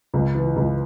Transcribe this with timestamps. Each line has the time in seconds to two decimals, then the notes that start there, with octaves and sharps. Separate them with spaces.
0.14 C#2
0.35 E3
0.56 C#2